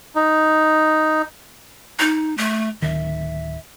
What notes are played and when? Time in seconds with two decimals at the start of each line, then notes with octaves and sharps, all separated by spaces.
0.16 D#4
1.99 D#4
2.38 A3
2.82 D1 D#3 E5